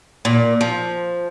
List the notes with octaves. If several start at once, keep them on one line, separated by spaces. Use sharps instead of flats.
A#2
F3